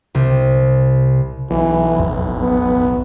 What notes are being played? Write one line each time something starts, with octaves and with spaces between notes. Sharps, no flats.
C2
B1 E3
E1 A1 F2
B3